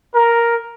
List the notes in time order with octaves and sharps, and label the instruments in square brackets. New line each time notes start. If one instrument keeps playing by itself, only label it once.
[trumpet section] A#4